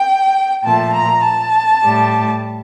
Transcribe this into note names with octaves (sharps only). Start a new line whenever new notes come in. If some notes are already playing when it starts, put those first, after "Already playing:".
Already playing: G5
A#2 F3 A3 A5
A#5
A5
A2 G3